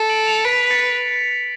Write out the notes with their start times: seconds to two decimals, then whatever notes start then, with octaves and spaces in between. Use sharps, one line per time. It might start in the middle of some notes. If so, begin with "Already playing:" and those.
Already playing: A4
0.09 D7 F#7
0.27 C#7 F7
0.45 B4 B6 D7
0.66 B6
0.70 A6 C#7